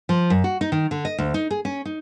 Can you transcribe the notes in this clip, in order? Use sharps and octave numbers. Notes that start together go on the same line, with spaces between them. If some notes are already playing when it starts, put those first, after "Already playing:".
F3
F#2
F#4
D#4
D#3
D3
D#5
D2
D#4
G#4
C#4
D#4